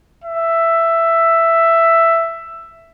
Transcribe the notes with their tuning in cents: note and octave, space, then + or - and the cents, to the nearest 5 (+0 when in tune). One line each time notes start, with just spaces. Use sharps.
E5 +10